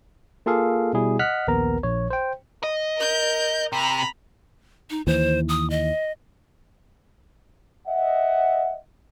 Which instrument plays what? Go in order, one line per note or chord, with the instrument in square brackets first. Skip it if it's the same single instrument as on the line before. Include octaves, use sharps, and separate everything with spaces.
[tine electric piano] A#3 F4 G#4 A4 F5
B2 G3 E4 G#4
D#5 F#5 F6 F#6 B6
A#1 D#2 B3 A#4 A#5
A#1 C#5
C5 G5
[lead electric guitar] D#5
[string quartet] A#4 G6
[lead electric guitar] C3 [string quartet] A#5 B5
[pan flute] D#4
[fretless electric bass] D#2 E3 [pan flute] C5
[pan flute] D#6
D#5
[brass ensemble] D#5 E5 F#5